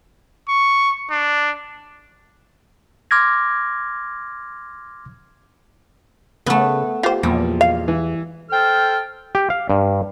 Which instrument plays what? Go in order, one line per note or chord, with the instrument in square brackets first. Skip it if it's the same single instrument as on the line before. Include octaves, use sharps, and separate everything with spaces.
[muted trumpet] C#6
D4
[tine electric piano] C6 D6 F6 G#6 A#6
[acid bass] C#3 [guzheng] A3 B3
[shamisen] F4 C5 [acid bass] G4
[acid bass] E2 [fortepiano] A#2 F3 [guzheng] G3
[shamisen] F5
[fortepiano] E3
[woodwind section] A4 C5 G5 A5 F6
[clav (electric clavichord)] G4
F5
G2